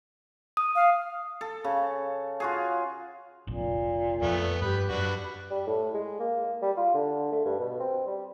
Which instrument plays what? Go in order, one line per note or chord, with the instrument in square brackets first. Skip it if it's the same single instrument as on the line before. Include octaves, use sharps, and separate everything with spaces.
[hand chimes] D#6
[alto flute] F5
[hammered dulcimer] A4
C#3
F4 F#4 G#4
[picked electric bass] F1 A#1 [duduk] A#2
[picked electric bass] F2 [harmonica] A3 B3
[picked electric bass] G2 [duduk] G4 [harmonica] B4
[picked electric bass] F#2 [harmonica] D4 F#4 B4
[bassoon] G3
A2
G#3
A#3
G3
F4
D3
A3
G2
B2
C4
G3